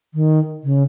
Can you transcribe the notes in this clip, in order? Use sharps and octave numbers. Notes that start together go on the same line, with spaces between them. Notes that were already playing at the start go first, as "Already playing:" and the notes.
D#3
C#3